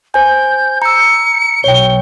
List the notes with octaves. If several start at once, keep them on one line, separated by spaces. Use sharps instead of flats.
C5 G#5 G6
A#5 E6 C#7
B1 C#5 G5 G7